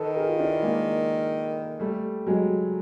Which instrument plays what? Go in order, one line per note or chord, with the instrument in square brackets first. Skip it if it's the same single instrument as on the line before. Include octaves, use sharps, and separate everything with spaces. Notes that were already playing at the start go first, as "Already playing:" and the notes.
Already playing: [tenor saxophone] D#3 [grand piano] A4 B4
[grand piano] G#4 A#4
F4
D4 E4
G#3 A#3
G3 A3
F#3 G#3